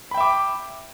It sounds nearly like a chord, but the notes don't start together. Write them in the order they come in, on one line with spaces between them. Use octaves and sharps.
B5 G5 E5 D6